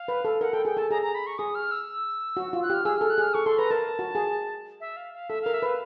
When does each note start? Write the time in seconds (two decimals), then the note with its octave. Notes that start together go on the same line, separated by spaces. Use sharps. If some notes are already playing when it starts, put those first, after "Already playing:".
Already playing: F5
0.08 B4
0.25 A4
0.41 A#4 F#5
0.53 A4 G5
0.65 G#4 G5
0.77 A4 A5
0.90 G#4 A#5
1.02 A#5
1.15 B5
1.27 C#6
1.38 G#4 D#6
1.55 F6
1.71 E6
2.37 F#4
2.53 F4
2.63 F#6
2.70 G4 F6
2.85 G#4 E6
2.98 A4 F6
3.10 F#6
3.18 G#4 F6
3.34 A4 C#6
3.46 A4 C6
3.58 B4 A#5
3.71 A#4 A5
3.99 F#4
4.15 G#4
4.80 E5
4.97 F5
5.13 F5
5.29 A4 E5
5.42 A#4 F5
5.54 E5
5.62 B4 F5